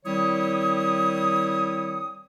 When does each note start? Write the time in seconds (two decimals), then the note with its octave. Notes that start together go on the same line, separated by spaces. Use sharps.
0.06 D#3 G3 C4 E4 C#5 D#6